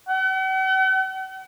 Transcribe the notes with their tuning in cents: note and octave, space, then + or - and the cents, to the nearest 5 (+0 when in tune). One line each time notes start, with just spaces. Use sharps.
F#5 +45